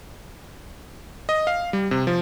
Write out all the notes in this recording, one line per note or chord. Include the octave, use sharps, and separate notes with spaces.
D#5
F5
G3
C3
F3